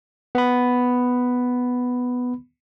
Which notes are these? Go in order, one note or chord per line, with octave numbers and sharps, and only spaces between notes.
B3 B5